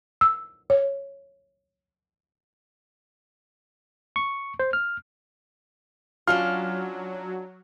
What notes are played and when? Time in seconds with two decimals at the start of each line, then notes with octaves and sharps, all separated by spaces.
0.21 E6
0.70 C#5
4.16 C#6
4.59 C5
4.73 F6
6.27 F#3 C#4 D4 F4 F6